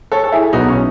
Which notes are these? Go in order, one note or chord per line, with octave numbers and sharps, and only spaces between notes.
A4 C#5
A4
E4 G#4
B1 B2 F#3 B3 D#4 F#4
C#4